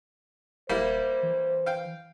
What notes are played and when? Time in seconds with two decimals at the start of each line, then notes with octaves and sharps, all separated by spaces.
0.69 D#1 G3 A#3 E4 C5
1.23 E3
1.66 F5 G5